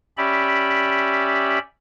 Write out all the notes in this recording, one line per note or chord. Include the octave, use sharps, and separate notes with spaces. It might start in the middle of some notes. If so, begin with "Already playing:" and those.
C#4 G4 D5 E5 B5